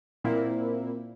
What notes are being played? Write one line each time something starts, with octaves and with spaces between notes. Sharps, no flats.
A#2 A#3 C4 E4